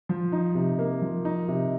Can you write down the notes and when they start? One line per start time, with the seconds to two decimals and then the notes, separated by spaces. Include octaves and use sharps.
0.09 F3
0.32 D#4
0.55 C3
0.79 A#3
1.02 F3
1.25 D#4
1.48 C3